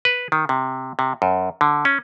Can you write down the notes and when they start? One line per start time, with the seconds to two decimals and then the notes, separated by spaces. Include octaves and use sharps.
0.05 B4
0.32 D#3
0.49 C3
0.99 C3
1.22 F#2
1.61 D3
1.85 C#4